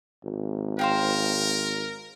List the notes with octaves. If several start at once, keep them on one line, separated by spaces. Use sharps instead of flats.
G#1
A#4 C5 F5 G5